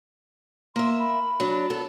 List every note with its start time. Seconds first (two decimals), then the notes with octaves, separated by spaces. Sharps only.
0.76 A#3 E5 C6
0.99 B5
1.40 F#3 D4
1.70 B3 A4